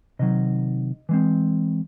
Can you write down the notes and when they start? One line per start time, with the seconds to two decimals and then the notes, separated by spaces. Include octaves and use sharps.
0.19 C3 D#3 F#3 D#5
1.09 E3 G#3 C4